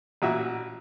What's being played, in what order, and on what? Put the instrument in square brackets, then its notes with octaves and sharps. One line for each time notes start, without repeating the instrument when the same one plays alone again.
[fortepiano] A1 A#2 F#4 E5